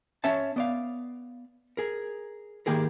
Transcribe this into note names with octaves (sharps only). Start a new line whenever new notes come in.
C#4 C#5 E5 A5
B3 D5 F5
G#4 A#4
D#3 A#3 G4 G#4 A#4